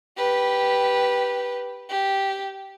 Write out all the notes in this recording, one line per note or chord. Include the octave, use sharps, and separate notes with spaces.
G4 B4
G4